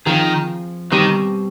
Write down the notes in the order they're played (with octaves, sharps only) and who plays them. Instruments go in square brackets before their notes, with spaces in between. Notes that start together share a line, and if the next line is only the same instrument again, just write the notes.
[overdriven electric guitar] D#3 [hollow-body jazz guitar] F3 C4 F4 G#4
[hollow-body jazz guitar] B2 G3 C4 [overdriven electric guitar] D#3